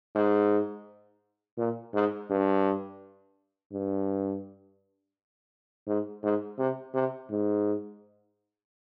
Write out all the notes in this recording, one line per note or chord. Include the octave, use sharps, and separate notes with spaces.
G#2
A#2
G#2
G2
G2
G#2
G#2
C3
C3
G#2